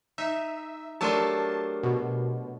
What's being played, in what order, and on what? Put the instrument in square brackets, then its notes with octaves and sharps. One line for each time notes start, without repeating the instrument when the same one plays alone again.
[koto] D#4 [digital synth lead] E5
[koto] F#3 A3 D4 [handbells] G4 A#4 C6 [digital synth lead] A5
[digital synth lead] B2